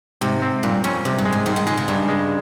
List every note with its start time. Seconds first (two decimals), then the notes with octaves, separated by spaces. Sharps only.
0.21 G#2 C3
0.42 C4
0.63 G2 A#2
0.84 F2 C#4
1.05 G2 C3
1.18 G2
1.25 G#3
1.32 G#2
1.46 G#2 D#3 G3
1.56 D#3 G3
1.67 C#3 F3 G#3
1.77 C#3
1.88 G2 C#3
2.09 G#3